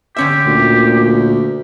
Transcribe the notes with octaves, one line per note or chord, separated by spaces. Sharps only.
D3 C#4 G4 E5
D2 A#2